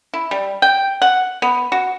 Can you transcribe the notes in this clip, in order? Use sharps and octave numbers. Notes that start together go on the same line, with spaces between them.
E4
G3
G5
F#5
B3
F#4